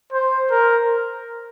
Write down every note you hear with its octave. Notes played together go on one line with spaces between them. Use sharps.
C5
A#4